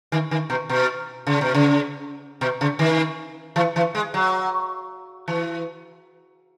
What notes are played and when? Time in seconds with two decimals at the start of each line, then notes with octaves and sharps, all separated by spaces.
0.12 D#3
0.31 D#3
0.50 B2
0.69 B2
1.27 C#3
1.41 B2
1.54 C#3
2.41 B2
2.61 C#3
2.79 D#3
3.56 E3
3.76 E3
3.95 G#3
4.14 F#3
5.28 E3